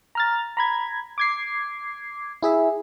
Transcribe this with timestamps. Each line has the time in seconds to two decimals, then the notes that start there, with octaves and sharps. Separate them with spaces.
0.15 A#5 F6 A6
0.57 A#5 B5 G#6
1.18 D6 G#6 C7
2.43 E4 G#4 E5